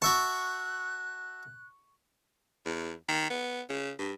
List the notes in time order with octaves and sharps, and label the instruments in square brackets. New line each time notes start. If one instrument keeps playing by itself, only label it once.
[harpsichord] F#4 E5 A5 [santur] C#6 [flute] F#6
[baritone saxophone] E2
D#3
B3
C#3
G2